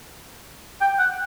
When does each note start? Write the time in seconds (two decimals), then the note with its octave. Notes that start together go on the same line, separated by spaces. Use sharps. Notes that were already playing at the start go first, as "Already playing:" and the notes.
0.81 G5
0.99 F#5